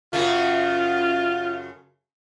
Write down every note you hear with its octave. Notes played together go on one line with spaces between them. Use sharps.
F#2 C#3 A3 F4